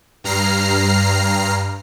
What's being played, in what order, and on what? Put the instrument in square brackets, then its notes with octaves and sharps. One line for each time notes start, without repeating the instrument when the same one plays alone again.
[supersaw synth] G2 A#5 F6 C7